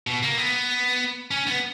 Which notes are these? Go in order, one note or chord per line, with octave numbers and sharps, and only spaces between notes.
B2
A#3
B3
C#4
B3